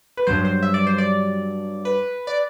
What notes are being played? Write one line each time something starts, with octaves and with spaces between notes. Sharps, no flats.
B4
G2 F#3 C5
C5
E5
D5
C5
D5
B4
D5